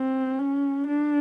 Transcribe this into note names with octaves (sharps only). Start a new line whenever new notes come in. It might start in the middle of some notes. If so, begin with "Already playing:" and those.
Already playing: C4
C#4
D4